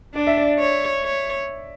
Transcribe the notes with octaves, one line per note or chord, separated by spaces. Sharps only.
D4 D5
E5
D5
C#5
C#5